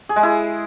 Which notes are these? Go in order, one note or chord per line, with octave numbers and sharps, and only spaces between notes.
G#4
G#3
E4